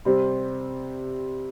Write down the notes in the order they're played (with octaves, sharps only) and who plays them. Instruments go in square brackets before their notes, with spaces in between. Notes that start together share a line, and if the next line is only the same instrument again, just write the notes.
[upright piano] C3 G3 C4